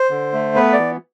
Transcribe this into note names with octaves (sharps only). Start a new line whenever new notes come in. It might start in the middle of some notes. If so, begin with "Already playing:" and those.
Already playing: C5
D3
A3
B3 B4
D5
E3